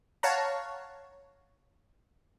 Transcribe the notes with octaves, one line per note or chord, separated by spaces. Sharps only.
C#5 F5 F#5 A5 A#5